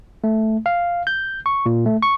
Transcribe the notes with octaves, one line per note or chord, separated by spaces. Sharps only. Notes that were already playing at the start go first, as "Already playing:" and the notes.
A3
F5
G6
C#6
A#2
A3
C#6